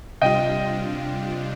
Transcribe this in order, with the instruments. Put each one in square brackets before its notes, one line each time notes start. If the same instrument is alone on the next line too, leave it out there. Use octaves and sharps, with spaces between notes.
[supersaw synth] C3 G3 D4 F4 [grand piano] D#5 G5